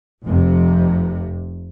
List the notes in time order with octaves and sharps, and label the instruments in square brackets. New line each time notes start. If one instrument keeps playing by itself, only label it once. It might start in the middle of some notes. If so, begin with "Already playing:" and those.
[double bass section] F1 F2 C3